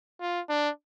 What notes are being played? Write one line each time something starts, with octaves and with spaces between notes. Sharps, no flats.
F4
D4